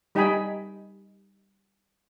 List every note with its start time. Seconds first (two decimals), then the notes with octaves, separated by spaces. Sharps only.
0.15 G3 D#4 D#5 G5 G#5 B5